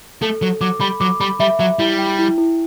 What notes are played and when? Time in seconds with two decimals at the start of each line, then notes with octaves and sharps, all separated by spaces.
0.22 A3 A4
0.42 F#3 A4
0.61 F#3 D6
0.80 G3 B5
1.01 F#3 D6
1.21 G3 B5
1.40 G3 E5
1.60 F#3 E5
1.79 G3 E4
1.99 G5
2.19 E4
2.38 E4